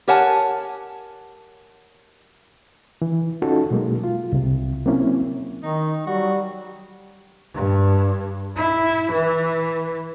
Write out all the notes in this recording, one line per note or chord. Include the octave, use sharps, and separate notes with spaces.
G4 A#4 C#5 F#5 G#5 A5
E3
C#4 D#4 F4 F#4 A4
B2 F#3 G#3 A#3
F4
C2 C3
F#3 A#3 C4 C#4 E4
D#3 D#4
F#3 G3 F#4
G2
E4
E3